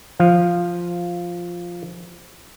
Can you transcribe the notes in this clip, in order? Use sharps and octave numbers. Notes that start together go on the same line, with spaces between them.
F3 F5